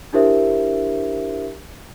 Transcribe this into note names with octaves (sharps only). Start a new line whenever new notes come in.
D4 E4 G4 A#4 C5 E5